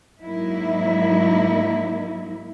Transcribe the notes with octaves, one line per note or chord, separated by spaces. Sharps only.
G#2 F#3 A#3 D#4 E4